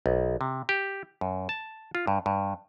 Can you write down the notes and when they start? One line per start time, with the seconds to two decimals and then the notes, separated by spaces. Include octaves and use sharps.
0.06 B1
0.41 C3
0.69 G4
1.21 F#2
1.49 A5
1.95 F4
2.07 G2
2.26 G2